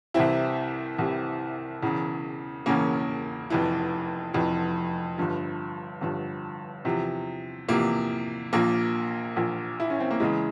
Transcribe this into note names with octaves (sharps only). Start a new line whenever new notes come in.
C2 C3 E3 C4 E4
C2 C3 E3
E1 E2 C#3
E1 E2 C#3 A#3 C#4
F1 F2 E3
F1 F2 E3
G1 G2 F3
G1 G2 F3
E2 C3 F3
E2 C3 F3 A#3
A#1 A#2 F3 A#3
A#1 A#2 F3
E4
C#4
C4
A#3
E2 C#3 E3 G#3